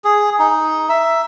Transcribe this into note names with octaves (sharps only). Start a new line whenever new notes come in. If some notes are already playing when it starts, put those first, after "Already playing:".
G#4
D#4
E5